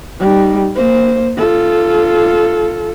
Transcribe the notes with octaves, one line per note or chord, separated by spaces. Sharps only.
G3 D#4
A#3 C5
F4 A4